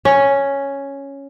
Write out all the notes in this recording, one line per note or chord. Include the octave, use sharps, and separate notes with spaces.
C#4